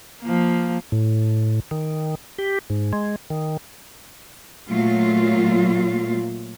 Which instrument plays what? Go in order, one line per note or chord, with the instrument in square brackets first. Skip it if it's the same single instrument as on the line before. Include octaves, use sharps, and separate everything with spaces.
[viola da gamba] F3 A#3
[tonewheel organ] A2
D#3
G4
G#2
G#3
D#3
[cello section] A#2 F#3 A3 F4